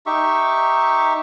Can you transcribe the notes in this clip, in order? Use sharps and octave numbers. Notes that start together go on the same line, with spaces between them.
D#4 G4 E5 C#6